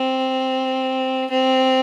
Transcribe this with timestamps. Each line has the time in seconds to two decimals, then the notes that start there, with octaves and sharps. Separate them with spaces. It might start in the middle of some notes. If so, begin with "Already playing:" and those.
Already playing: C4
1.30 C4